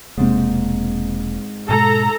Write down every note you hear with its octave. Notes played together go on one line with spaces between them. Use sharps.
E1 G#2 C3 A#3 C4
G#2 B2 G#3 A4 A#5